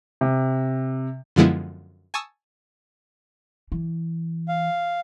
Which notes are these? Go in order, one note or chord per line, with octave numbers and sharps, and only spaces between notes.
C3
F#2 D3 F3 G#3 B3 E4
G#5 A5 C#6 D#6 E6
E3
F5